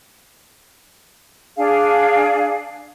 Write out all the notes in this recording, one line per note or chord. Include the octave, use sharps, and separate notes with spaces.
D4 G#4 F5